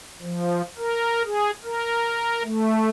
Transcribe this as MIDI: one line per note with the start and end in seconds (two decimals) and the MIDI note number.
0.22 0.62 53
0.78 1.23 70
1.25 1.51 68
1.64 2.43 70
2.43 2.89 57